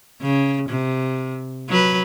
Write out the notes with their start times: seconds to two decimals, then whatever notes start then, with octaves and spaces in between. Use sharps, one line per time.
0.21 C#3
0.69 C3
1.68 F#3 B4